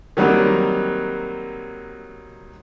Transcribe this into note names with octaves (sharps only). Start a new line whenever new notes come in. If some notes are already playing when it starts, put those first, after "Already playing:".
D#3 F#3 G3 A#3 C4